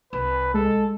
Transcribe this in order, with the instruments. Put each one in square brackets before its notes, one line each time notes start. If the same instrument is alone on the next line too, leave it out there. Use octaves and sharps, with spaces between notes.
[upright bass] C2 [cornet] B4
[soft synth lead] G#3 [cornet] A4